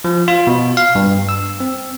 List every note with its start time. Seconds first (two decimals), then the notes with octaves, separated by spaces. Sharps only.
0.04 F3
0.28 F4
0.47 B2
0.77 F5
0.95 G2
1.29 E6
1.60 C4